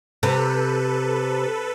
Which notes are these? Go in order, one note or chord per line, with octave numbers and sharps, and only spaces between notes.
C3 A4 B4